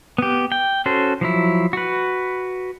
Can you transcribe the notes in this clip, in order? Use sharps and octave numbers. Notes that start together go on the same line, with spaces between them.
B3 G4
G5
C#4 F#4 A4 C5
F3 F#3 E4
F#4 B4